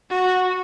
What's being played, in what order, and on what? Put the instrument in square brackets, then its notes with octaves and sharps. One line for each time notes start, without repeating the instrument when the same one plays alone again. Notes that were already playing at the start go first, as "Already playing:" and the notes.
[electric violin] F#4